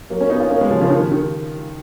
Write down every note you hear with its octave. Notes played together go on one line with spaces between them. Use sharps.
F#3 A#3
A#3 C#4
B3 D#4
C#4 F4
A#3 C#4
G#3 B3
C#3 F3
C#3 F3
D#3
D#3